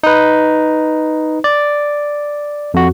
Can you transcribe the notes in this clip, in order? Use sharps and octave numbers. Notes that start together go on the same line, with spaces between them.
D#4 B4
D5
F2 F#4